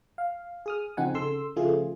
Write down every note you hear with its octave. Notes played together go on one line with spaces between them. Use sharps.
F5
G#4 D#6 F6
C#3 F3 C4 D#4 F#5 G#5
C#3 A4 C6 E6
C#3 F3 A3 F4 G#4